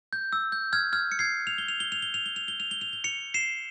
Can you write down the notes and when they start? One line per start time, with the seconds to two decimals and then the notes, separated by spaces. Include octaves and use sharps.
0.13 G6
0.33 E6
0.52 G6
0.73 F6 G#6
0.93 F6 G#6
1.12 C#7
1.19 G#6 C7
1.47 F7
1.58 G7
1.68 F7
1.80 G7
1.92 F7
2.02 G7
2.14 F7
2.26 G7
2.36 F7
2.48 G7
2.60 F7
2.71 G7
2.81 F7
2.93 G7
3.04 C#7 F7
3.34 C7 E7